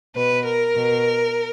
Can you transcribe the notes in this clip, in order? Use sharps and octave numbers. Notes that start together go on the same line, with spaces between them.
B2 B4
A#4
B2